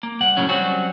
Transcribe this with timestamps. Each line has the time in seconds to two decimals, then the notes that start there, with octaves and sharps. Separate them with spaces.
0.03 A#3
0.20 C2 F#5
0.37 F#2 A2 C#3 F#3 C#4
0.49 F#3 G3 C4 C#4 F#4